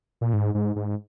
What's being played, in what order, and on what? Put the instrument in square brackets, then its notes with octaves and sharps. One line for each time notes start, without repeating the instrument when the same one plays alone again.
[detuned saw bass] A#2
G#2
G#2
G#2